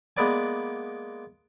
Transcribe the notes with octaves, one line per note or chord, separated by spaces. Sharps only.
G#3 A#3 B3 B4 D5 G#5